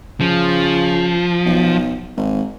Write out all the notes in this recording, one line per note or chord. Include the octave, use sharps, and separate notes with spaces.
C#3 F3
B1
G#1